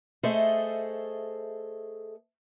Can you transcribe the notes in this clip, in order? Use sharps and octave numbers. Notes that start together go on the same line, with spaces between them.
A3 G#4 A4 C5 D#5 E5